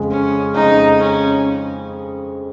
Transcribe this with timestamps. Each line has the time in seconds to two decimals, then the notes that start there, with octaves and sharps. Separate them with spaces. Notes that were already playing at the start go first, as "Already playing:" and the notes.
Already playing: F2 C#3 G#3
0.12 C#4
0.54 F2 C#3 G#3 D#4
0.99 C#4